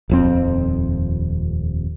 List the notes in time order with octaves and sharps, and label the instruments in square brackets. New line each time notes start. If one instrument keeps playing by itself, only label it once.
[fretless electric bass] D#1 F2 C4